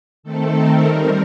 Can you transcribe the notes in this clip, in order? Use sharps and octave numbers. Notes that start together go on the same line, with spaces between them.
D#3 A3 C4 A4
A#4
D#3 G3 C4 A#4